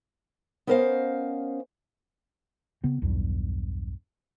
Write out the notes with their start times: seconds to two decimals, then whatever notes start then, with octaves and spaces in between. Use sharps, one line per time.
0.67 B3 C#4 A#4 C5 D#5 F5
2.84 C#3 B3 C4
3.02 B1 E2 G2